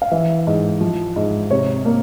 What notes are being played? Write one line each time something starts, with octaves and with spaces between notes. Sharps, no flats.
F5
E3 E5
G#2
F3
G#2
C3 C#5
A#3